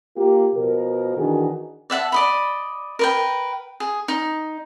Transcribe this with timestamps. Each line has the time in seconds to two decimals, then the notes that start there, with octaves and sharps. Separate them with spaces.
0.16 A#3 F4 G4
0.56 B2 F3 A#4
1.18 D#3 E3 D4 F#4 G#4
1.90 D5 E5 F#5 A5
2.12 D5 D#5 B5
2.99 A#4 B4 G5
3.80 G#4
4.08 D#4